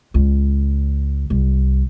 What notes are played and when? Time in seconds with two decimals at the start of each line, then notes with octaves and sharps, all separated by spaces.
0.14 C#2
1.30 C2